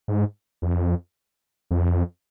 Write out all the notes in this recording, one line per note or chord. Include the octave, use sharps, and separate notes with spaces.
G#2
F2
F2